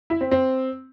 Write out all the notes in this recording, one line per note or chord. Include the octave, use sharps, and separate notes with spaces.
E4
C4
C4